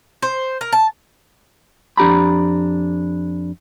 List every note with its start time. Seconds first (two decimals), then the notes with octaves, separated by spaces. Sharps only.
0.22 C5
0.61 A#4
0.72 A5
1.97 F2 D4 G4 A#5 B5